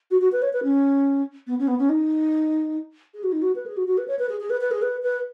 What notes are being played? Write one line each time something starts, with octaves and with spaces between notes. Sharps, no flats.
F#4
F#4
B4
C#5
B4
C#4
B3
C#4
B3
C#4
D#4
G#4
F#4
D#4
F#4
B4
G#4
F#4
F#4
B4
C#5
B4
G#4
G#4
B4
B4
G#4
B4
B4